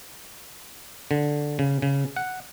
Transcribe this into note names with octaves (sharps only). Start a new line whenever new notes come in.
D3
C#3
C#3
F#5